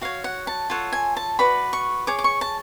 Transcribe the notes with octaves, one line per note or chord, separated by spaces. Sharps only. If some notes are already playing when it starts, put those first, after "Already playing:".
F#4 C#5 F5
F#5
A5
F4 A4 C#5 F#5
G#5
A5
F#4 B4 D5 B5
C#6
G#4 C#5 D6
D6
C#6
A5